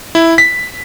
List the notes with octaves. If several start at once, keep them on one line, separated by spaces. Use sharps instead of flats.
E4
B6